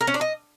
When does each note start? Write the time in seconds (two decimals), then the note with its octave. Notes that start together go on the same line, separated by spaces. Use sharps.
0.01 A#4
0.07 C#4
0.14 D4
0.21 D#5